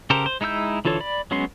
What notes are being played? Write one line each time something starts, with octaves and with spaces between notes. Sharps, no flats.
C#3 G4 A4 A#4 C5
C5
G#3 D#4 E4 E6 G6
D3 E3 F4 A4 C#5
D5 B5
F#3 G#3 B3 C#4 C6